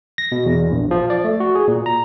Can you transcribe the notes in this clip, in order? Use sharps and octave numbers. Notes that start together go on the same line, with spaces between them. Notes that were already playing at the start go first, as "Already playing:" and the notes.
A#6
B2
E2
A#1
F3
D5
A3
F#4
G#4
A#2
A#5